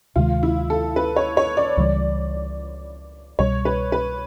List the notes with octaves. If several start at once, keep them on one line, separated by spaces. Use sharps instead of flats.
D2 C3 D#3 G#3 F4
E4
A4
B4
C#5
C#5
D5
C#2 C#3 E3 G3
C2 B2 G3 C#5
B4
B4